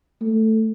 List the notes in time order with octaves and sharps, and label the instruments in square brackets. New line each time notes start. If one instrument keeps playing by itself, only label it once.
[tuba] A3